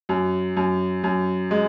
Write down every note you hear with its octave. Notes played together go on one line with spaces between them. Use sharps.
F#2
F#2
F#2
G#3